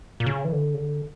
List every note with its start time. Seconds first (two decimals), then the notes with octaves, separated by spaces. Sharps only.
0.20 A#2
0.26 C#3
0.45 E3
0.52 D3
0.74 C#3
0.78 D3